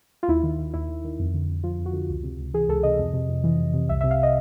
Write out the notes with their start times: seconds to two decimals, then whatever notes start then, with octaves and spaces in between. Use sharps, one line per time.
0.23 F4
0.28 D#2 E4
0.43 D#3
0.59 D#3
0.74 D#2 E4
0.89 D#2
1.04 D#3
1.19 F2
1.34 D3
1.49 F2
1.64 F3 F4
1.79 F2
1.86 F#4
1.93 D3
2.09 C#2
2.23 C3
2.39 C#2
2.54 E3 G#4
2.69 C#2 A4
2.83 C3 D#5
2.99 F2
3.13 C3
3.29 F2
3.44 E3
3.59 F2
3.73 C3
3.89 C2 E5
4.01 E5
4.04 C3
4.11 F5
4.23 D#5